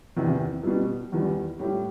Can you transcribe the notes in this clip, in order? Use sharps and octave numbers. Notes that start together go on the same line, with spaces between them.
E2 C3 D#3
B2 G3
E2 D#3 G3
A2 G3 G4